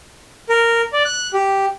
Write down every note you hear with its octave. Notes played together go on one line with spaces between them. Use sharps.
A#4
D5
F#6
G4